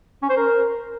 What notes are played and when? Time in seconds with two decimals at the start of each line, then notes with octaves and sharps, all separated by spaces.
0.22 C#4
0.30 C5
0.37 A#4